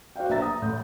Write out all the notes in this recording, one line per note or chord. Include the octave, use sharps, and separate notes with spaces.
F#4 C5 D5 F5 G5
A#1 B4 E5 A#5 A6
A#5 D#6
A1 A2 G6